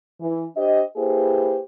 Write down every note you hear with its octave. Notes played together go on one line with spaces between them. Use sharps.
E3
D4 G4 C5 D#5
A#3 E4 G4 G#4 B4 C5